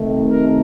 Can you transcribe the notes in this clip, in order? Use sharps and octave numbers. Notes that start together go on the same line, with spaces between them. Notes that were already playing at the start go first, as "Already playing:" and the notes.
Already playing: C3 D#3 A3
A#4